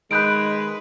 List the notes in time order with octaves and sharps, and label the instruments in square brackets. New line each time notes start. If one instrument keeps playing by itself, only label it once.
[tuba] D#3 [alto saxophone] G#3 [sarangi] B4 [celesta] F#6 G6 D7